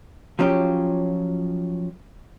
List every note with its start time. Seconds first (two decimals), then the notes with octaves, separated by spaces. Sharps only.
0.39 F3 F#3 C#4 F4 G4